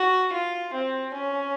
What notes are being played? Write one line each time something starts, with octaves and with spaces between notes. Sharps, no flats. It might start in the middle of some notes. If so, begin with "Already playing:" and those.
Already playing: F#4
F4
C4
C#4